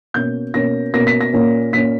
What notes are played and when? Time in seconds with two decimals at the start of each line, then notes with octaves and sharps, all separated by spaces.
0.14 B2 A#3 C#4 G6
0.54 B2 A#3 C#4 A#6
0.94 B2 A#3 C#4 A#6
1.07 B6
1.21 A#6
1.33 A#2 A#3 C#4
1.72 A#2 A#3 C#4 B6